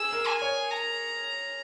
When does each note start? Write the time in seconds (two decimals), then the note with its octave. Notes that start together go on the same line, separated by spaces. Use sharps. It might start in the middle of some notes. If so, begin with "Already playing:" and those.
Already playing: G#4 E6
0.12 A#4
0.27 G#5
0.42 C#5
0.71 A#5